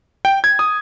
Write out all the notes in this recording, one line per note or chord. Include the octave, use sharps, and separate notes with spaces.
G5
G#6
D#6